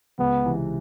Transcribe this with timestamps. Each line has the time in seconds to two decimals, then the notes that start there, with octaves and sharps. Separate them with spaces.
0.18 C#2 B3
0.44 C3 E3